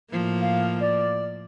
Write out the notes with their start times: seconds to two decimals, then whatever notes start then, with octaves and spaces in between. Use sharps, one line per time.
0.11 A2 F3 A#3
0.41 F5
0.81 D5